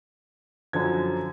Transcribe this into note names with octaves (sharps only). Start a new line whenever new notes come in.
F#2 D3 F3 G#6